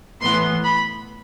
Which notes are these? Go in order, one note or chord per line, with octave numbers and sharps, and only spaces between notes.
A2 E3 B3 C6
B5